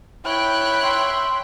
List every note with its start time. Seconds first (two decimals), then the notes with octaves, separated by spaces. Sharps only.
0.25 E4 C#5 G5 B5 F#6
0.82 E5 C6